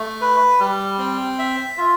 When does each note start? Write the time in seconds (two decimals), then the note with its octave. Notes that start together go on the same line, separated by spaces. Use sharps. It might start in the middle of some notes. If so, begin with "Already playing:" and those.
Already playing: A3
0.21 B4
0.60 G3
0.99 C4
1.39 E5
1.78 F4